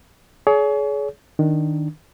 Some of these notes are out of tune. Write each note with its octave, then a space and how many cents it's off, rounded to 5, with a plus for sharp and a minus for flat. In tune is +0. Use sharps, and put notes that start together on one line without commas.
G#4 +30 C#5 +40
D#3 +0 D4 +0